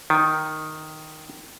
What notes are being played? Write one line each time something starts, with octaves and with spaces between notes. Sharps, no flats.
D#3